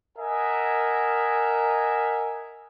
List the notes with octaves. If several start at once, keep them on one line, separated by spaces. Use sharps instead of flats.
A#4 D#5 E5 F#5 G#5